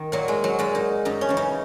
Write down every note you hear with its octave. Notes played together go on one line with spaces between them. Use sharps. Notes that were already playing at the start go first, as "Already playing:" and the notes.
Already playing: D#3
A#2 F#3
G#3
F#3
A#2 G#3
D#4
F#2 D#4
C#4
C#3 E3
D#4